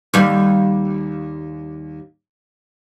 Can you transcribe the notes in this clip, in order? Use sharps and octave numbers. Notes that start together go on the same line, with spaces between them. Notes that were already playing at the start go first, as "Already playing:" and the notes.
D#2 G3